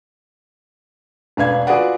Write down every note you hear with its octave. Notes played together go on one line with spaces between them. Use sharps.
E1 D4 B4 F5 G#6
F4 F#4 G#4 B4 D5 F#5